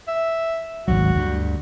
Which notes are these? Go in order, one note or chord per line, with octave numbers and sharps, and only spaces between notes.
E5
G#1 D2 F#3 F#4
D2 G2